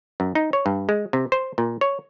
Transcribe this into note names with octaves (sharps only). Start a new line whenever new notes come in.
F#2
D#4
C#5
G2
G#3
C3
C5
A#2
C#5